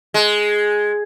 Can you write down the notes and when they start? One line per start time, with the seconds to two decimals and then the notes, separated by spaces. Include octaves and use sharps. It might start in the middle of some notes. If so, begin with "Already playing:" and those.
0.14 G#3